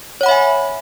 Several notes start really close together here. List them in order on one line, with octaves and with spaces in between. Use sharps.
C#5 F#5 B5 E5 G#5